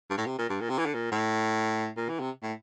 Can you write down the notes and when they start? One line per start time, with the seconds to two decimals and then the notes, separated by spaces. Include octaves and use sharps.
0.10 G2
0.18 A2
0.26 C3
0.39 A#2
0.49 G2
0.61 A#2
0.70 C3
0.78 E3
0.86 D3
0.94 A#2
1.12 A2
1.97 A#2
2.09 E3
2.20 C3
2.43 A2